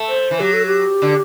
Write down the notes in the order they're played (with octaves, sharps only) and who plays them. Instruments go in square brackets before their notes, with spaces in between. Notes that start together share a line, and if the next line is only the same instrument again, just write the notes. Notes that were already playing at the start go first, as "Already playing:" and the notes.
Already playing: [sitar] A3
[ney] C5
[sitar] E3
[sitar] F#3 [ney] G4
[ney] A4
G4
[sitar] D3